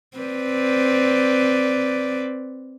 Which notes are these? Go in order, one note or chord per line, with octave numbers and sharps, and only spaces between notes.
C4 B4 D5